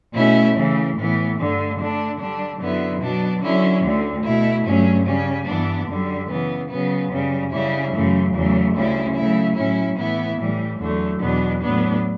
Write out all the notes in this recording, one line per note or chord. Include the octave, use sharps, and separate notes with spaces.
B2 A3 C#4 E4
C#3 E3 A3
A2 E3 B3
G2 D3 A3
D3 A3 D4
D3 G3 D4
F#2 D3 F#3 B3 E4
B2 F#3 B3 D4
D3 F#3 C#4 E4
D2 D3 A3
B2 A3 E4
G2 F#3 A3 C#4
C#3 G3 C#4
G2 E3 B3 D4
F#2 D3 G3
C#3 E3 B3
C#3 F#3 B3
F#2 C#3 G3
C#3 G3 C#4 E4
F#2 C#3 E3 A3
E2 C#3 F#3 A3
D2 C#3 G3 C#4 E4
C#3 F#3 A3 E4
A2 F#3 C#4 E4
A2 E3 B3 E4
A2 E3 G3
E2 D3 F#3 A3
E2 B2 F#3 B3 D4
A2 F#3 B3 D4